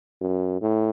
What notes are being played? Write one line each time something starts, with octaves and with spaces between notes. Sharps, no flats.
F#2
A2